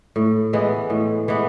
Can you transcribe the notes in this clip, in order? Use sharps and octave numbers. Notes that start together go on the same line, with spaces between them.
A2
E3 G#3 B3
A2
E3 G#3 B3